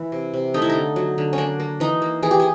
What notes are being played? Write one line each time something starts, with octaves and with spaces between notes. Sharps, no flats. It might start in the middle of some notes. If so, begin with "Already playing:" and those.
Already playing: E3 E4
C3
C3
A3 D#4
E4
D#4
D3
F#3
D3
C#4
A#3 D4
A#3
E3 D#4
A#3
E3 G#4
G4
G#4